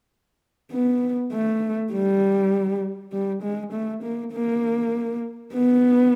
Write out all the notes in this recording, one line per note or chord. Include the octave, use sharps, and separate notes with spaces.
B3
A3
G3
G3
G#3
A3
A#3
A#3
B3